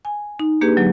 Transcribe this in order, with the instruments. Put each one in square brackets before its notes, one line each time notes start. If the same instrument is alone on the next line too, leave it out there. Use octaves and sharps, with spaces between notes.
[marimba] G#5
D#4
A#3 D4 G4 G#4 B4
D3 F#3 G#3